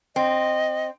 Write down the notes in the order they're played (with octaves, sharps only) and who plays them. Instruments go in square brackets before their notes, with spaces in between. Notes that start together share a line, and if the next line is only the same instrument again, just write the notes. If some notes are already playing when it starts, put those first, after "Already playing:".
[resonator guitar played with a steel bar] C4 [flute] D#5